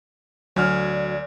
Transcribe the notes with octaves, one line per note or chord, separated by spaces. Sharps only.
D2 F#3 D5 G#5 F6